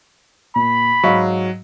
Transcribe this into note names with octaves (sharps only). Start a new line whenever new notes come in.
A#2 B5
G#2 F#3 F5 C#6